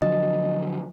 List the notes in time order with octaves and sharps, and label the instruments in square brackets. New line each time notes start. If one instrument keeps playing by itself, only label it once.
[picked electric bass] D3 F3 F#3 [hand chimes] D#5